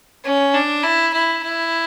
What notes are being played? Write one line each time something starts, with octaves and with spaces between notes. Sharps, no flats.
C#4
D4
E4
E4
E4